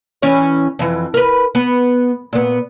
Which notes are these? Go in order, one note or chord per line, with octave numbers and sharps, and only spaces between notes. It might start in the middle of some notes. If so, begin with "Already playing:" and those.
E3 C#4 C#5
F2 E3
A#4 B4
B3
A#2 B3